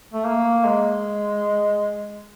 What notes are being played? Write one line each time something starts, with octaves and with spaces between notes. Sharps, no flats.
A3
A#3
G#3